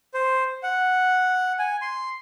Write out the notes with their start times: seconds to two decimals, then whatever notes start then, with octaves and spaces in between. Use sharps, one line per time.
0.14 C5
0.63 F#5
1.59 G#5
1.82 C6